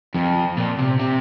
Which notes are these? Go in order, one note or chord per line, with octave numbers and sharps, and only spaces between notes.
F2
A#2
C3
C3